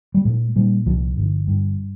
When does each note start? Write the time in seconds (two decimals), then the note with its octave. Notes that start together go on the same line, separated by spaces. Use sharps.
0.14 G3
0.25 A#2 G#3
0.56 A#2 G3
0.86 C2 F3
1.17 G1
1.47 G2